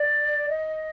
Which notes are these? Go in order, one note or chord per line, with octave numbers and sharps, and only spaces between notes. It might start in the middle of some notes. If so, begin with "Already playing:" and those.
Already playing: D5
D#5